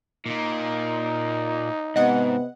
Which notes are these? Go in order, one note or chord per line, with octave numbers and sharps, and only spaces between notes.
A#2 A#3 D#4
G#2 C3 B3 D#5 F#5